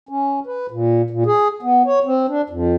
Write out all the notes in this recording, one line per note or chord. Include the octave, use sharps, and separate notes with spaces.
C#4
B4
A#2
A#2
G#4
B3
C#5
C4
D4
F2